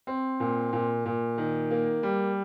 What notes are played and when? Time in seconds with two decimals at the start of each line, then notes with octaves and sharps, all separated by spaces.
0.07 C4
0.40 A#2
0.73 A#2
1.06 A#2
1.38 D#3
1.71 A#3
2.03 G3